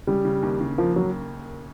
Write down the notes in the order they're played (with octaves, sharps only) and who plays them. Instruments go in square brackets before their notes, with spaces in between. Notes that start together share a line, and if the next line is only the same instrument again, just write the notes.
[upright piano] C#3 [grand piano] G3
[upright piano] C#3
D#2
C#3
[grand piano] F3 [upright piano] A#3
[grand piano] F#3